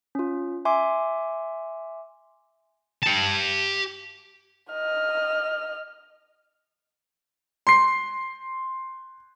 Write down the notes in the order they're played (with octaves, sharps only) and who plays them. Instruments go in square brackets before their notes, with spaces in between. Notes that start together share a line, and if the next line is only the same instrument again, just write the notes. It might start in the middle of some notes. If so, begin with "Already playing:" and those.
[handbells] C#4 F4
E5 G#5 C6 D6
[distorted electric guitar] G4 A5
[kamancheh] D#5 F6
[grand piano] C6 C7